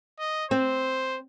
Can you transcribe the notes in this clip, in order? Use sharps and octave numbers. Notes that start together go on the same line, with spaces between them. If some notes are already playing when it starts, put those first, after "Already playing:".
D#5
C4 C5